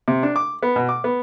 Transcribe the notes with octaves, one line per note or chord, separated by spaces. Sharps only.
C3
D4
D6
B3
B2
D6
B3